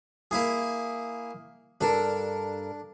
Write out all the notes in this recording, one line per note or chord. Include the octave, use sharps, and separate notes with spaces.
A#3 E4 G#4
G2 D4 A4 A#4